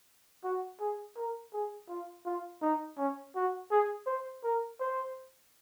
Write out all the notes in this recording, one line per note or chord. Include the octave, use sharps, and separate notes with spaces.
F#4
G#4
A#4
G#4
F4
F4
D#4
C#4
F#4
G#4
C5
A#4
C5